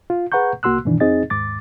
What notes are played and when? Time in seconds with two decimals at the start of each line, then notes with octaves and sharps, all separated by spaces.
0.10 F4
0.32 G#4 B4 F#5 A#5 C#6 G6
0.63 C2 A#3 F#4 C6 E6 F#6
0.85 G2 B2 D#3 E3 D4
1.00 F2 C4 D#4 G#4 D#5 A6
1.30 D#2 G#2 D6 A6